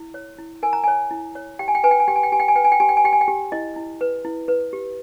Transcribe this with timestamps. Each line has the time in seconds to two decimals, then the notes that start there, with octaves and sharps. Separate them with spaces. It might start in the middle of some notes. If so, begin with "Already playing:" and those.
Already playing: E4
0.14 C#5
0.38 E4
0.63 A#4 G#5
0.73 A#5
0.84 C#5 G#5
1.11 E4
1.35 C#5
1.59 G4 G5
1.68 G#5
1.75 G5
1.84 B4 G#5
1.91 G5
2.00 G#5
2.08 G4 G5
2.16 G#5
2.23 G5
2.32 G4 G#5
2.40 G5
2.48 G#5
2.55 B4 G5
2.64 G#5
2.72 G5
2.80 G4 G#5
2.89 G5
2.97 G#5
3.05 G4 G5
3.13 G#5
3.21 G5
3.28 G4
3.52 E4 D#5
3.76 E4
4.01 B4
4.25 E4
4.48 B4
4.73 G4